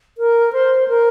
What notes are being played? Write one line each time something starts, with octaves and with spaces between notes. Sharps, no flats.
A#4
C5
A#4